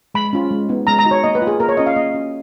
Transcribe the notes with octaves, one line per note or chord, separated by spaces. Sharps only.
G#3 B5
C#4 F4
G#3
B3 D#4
G#3 A#5
A#5
D#4 F#4
C#5
A#3 D#5
B4
F4
G#4
A#3 A#4
C#5
C#4 F4 D#5
F5
A#3 D#5
C#4 F#4